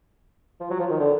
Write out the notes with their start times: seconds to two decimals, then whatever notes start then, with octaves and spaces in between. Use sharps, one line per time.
0.60 F3
0.70 F#3
0.80 F3
0.90 D#3
1.00 D3